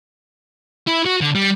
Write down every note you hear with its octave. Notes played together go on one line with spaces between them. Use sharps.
E4
F#4
D3
G3